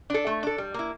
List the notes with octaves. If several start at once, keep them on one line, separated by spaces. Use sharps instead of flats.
D4 A4
A3
D4 A4
G3
A#3 E4